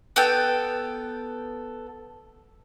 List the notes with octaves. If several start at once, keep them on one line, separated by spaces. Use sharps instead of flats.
B3 A4 G5